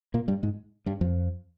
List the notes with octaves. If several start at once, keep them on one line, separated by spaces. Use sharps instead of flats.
A#2 A#3
G2 G3
G#2 G#3
G2 G3
F2 F3